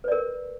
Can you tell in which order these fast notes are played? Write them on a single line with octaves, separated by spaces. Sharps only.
B4 D5 A#4